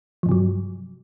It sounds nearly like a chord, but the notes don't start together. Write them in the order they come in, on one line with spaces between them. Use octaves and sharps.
F3 G2 C3 F#3